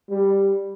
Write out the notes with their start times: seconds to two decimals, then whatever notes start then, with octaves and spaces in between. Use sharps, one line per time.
0.10 G3